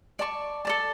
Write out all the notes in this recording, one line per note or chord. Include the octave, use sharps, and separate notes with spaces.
D5 A5 C#6
A4 D5 A5